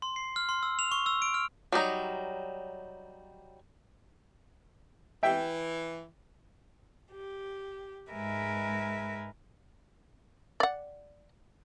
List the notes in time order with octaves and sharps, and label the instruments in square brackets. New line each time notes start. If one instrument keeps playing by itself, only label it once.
[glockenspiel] C6
C7
F6
C6
E6
F7
C#6
E6
D7
F6
[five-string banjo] F#3 G3 D#4 A#5
[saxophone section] E3 [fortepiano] E5 G5
[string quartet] G4
G#2 G#3 A#4 B4 E5 G#5
[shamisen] D5 F#5